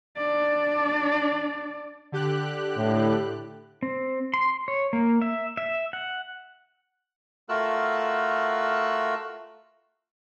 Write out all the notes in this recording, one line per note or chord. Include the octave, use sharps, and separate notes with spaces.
D4 D5
D3 G4 F#6
A2
C4
C6
C#5
A#3
E5
E5
F#5
A3 F4 F#4 A#4 E6 F#6